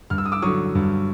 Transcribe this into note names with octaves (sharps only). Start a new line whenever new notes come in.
G2 F6
E6
D#6
D6 E6
D3 F#3 C#6 D#6
G2